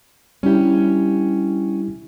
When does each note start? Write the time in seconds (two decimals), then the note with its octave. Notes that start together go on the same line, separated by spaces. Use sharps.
0.43 G3 C#4 D4 E4 G4